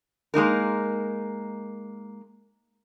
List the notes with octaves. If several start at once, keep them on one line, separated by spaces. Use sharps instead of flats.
G#3 A#3 D#4 A#4